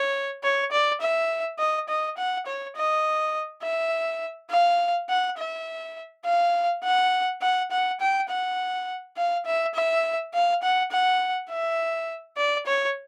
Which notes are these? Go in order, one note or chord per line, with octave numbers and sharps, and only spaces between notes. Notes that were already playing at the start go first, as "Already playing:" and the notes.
Already playing: C#5
C#5
D5
E5
D#5
D#5
F#5
C#5
D#5
E5
F5
F#5
E5
F5
F#5
F#5
F#5
G5
F#5
F5
E5
E5
F5
F#5
F#5
E5
D5
C#5